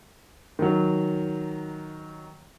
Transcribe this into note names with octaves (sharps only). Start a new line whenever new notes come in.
D#3 F#3